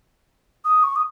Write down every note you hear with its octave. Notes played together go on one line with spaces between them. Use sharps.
D#6
C#6
D#6